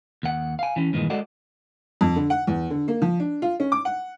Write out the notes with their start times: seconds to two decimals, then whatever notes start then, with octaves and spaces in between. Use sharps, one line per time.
0.23 D#2 F#5
0.59 F5 G#5
0.76 E3 C#4
0.93 G2 A#2 D#3 E3 G#3
1.10 G#3 F#4 A4 D5 D#5 F#5
2.01 F2
2.16 D3
2.30 F#5
2.47 E2
2.70 D3
2.88 A#3
3.02 F3
3.20 D4
3.42 F4
3.60 C#4
3.72 D6
3.85 F#5